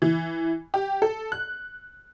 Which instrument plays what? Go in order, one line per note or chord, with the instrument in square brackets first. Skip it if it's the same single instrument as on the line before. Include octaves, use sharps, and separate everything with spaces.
[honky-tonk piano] E3
G4
A4
F#6